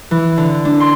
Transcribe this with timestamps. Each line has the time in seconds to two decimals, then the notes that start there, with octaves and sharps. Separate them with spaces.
0.11 E3
0.37 D3
0.65 D4
0.80 C6